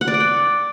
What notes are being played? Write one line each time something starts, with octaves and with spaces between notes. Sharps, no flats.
F#5
D5
D6
G5